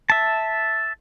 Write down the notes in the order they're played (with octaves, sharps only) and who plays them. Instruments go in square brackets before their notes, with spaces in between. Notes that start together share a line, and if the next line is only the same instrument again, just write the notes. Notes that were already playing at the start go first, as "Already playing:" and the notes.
[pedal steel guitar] E5 A5